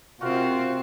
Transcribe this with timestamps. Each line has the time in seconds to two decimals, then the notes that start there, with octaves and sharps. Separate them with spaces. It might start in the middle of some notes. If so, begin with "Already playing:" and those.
0.21 C3 C4 F4 F#4 A#4